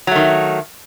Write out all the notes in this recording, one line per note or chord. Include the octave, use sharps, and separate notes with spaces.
D#3 F#3 A3